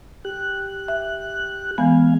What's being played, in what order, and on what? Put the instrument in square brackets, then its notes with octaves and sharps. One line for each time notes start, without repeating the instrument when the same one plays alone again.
[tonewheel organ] G4 F#6
[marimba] E5
[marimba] E3 B3 [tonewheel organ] G#3 F5 G#5